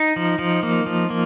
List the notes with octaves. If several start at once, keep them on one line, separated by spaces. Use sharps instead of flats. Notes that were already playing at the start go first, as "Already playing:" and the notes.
Already playing: D#4
F3
F3
A#3
F3
A#3